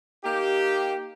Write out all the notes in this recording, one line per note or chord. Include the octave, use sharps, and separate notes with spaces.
A#3 D#4 G4